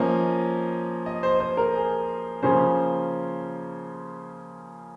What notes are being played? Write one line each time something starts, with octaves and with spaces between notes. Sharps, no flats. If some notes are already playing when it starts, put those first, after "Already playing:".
Already playing: F3 A#3 C#4 D#5
D#5
C5
C5
A#4
G#4
C#3 F3 A#3 C#4 C5